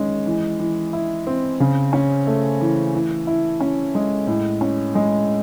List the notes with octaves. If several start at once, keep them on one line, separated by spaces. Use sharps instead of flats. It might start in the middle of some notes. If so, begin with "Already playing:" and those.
Already playing: D#3 G#3 C#4
E3
E3
E4
C4
C#3
C#4
A3
E3
E3
E4
C#4
G#3
A2
C#4
G#3